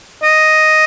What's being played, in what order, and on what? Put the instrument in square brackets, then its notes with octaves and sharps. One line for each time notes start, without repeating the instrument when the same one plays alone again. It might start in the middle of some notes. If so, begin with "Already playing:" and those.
[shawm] D#5